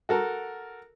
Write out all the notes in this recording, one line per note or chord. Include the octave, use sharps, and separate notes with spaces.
F#4 A4 A#4